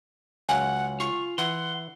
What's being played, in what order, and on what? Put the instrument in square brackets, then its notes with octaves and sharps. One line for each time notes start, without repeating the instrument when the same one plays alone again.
[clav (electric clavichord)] C#2 F#3 F5 [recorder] F#5 [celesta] G#5
[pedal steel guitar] F4 [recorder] C#6
[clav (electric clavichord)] E3 [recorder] F#5 [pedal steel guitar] C6